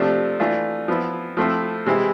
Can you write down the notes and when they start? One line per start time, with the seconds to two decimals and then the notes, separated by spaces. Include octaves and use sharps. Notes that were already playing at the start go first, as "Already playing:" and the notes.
Already playing: C3 F3 A3 D4
0.40 E3 A3 D4 F4
0.88 F3 B3 E4
1.37 F3 A3 C4 E4
1.86 C3 E3 G#3 C4 E4